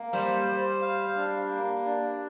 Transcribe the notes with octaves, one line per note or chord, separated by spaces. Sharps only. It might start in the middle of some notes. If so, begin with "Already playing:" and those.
Already playing: A#3
G3 C5
C5
F5
D4
A#3
D4